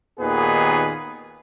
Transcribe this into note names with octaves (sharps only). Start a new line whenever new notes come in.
D#2 A#2 D#3 B3 G#4 B4